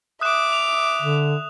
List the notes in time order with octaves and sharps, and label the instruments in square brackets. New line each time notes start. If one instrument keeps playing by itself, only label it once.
[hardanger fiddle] E5 D6 [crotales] D#6 F#6 E7
[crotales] F7
[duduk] D3